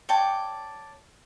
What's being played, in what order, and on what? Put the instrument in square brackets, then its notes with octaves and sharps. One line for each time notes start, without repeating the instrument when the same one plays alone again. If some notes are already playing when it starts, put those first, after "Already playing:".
[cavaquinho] C#5 D5 G5 A5